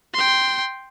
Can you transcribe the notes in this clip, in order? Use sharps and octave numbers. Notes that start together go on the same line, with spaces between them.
G5 C6